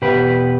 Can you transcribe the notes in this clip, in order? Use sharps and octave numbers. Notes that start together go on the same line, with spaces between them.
E2 B2 G4 B4